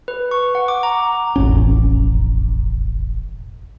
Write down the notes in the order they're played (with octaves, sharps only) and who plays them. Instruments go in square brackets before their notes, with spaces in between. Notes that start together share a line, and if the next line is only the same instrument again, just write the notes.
[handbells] B4
C#6
F#5
D6
A#5
[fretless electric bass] E1 A1 F2 C#4